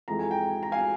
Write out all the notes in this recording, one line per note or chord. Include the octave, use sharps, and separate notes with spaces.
F2 E3 G#3 A#5
G#5
G5 A#5
A#5
F5 G#5